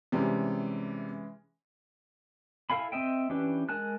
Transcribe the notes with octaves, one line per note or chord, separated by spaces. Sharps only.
C3 E3 G3 G#3 C#4
E4 A4 F5 G#5 B5
C4 D#5 E5 G5
E3 C#4 D4 G4 B4
G#3 A#4 G#5 A5 F#6